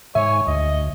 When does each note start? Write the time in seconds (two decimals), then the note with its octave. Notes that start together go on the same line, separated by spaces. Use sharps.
0.15 G#2 C#5 E5 G#5
0.47 D2 D#5